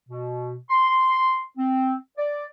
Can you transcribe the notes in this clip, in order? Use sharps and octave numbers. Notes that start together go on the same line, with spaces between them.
B2
C6
C4
D5